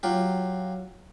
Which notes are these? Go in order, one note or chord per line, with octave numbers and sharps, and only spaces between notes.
F#3 F4 G4